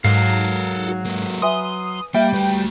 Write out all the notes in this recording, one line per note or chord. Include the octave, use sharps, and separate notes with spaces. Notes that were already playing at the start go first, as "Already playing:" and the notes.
G#2 F#3 A4 A#4 F5
F#4
G#3 A#3
B4 E5 G#5 C6 D#6
G3 A#3 E5 F5 G5
A3 F#4 B4